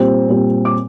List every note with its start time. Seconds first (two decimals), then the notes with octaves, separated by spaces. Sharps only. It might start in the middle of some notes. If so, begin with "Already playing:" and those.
Already playing: A#2 G3 C4
0.28 A#2 G3 C4
0.65 D6